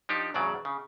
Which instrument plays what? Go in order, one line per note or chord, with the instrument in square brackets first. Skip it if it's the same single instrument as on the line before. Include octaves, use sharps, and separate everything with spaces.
[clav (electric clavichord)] F3 D4 D#4 G4
E2 A2 C#3 F#3 D5
C#3